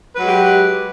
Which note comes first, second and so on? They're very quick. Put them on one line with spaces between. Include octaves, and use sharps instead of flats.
B4 F#3 G#3 G4